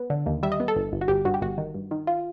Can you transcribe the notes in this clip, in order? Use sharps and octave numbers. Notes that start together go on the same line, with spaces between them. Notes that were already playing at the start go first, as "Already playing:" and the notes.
Already playing: B3
D3
D#2
G3 E5
D#5
B3
A4
G1
G1
F#4
G1 G4
G2 F#4
G4
G1 F#4
D#3
G2
D#3
F4